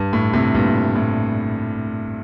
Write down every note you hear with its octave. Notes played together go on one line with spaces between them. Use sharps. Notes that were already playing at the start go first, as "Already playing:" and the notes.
Already playing: G2
A2
A2 C3
G2 A#2
A2